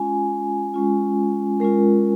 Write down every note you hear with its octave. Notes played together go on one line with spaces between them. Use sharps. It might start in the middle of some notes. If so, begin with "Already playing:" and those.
Already playing: G#3 C#4 F4 G#5
G#3 C#4 F4
G#3 C#4 F4 A#4